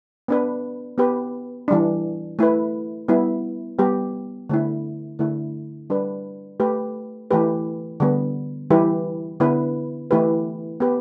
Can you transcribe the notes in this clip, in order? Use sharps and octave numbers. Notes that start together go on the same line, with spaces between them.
B3 D4 B4
B3 G4 B4
E3 G3 D4
A3 E4 B4
G3 B3 E4
G3 B3 G4
D3 A3 E4
D3 A3 E4
G3 D4 B4
A3 G4 B4
E3 A3 G4 B4
D3 G3 B3
E3 G3 E4 G4 B4
D3 B3 E4 B4
E3 A3 E4 G4 B4
B3 G4 B4